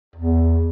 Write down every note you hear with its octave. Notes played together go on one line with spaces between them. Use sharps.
E2